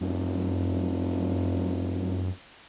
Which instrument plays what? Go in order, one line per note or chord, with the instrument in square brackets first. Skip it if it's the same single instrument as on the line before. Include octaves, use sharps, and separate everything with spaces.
[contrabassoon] F1 [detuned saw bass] F#2